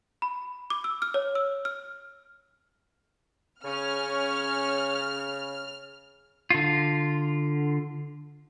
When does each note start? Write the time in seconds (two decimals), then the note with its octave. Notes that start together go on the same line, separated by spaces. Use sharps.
0.22 B5
0.70 D6
0.84 E6
1.02 F6
1.14 C#5
1.35 E6
1.65 F6
3.64 C#3 C#4 F6
6.50 D3 F4